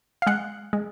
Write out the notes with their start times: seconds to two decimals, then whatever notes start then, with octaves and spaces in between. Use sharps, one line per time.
0.22 F5
0.27 G#3 F#5
0.73 G#3